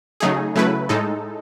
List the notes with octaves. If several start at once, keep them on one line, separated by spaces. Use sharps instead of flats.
C#3 F#3 A3 D#4 G#4
C#3 F#3 A3 E4 B4
A2 G#3 D#4 A4